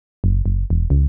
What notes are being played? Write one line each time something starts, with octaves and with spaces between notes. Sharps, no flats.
F#1
F#1
E1
C#2